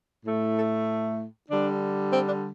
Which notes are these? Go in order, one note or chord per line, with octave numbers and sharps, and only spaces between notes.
A2 A3
A4
D3 G3 D4
C4
D4